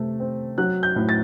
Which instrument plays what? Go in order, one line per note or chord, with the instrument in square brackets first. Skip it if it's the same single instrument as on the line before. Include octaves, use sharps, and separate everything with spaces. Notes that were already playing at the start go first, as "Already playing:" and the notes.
Already playing: [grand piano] C3 A3
C4
F#3 F#6
G6
A2
A6